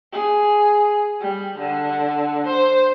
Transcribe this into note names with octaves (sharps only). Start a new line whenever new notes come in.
G#4
G3
D3
C5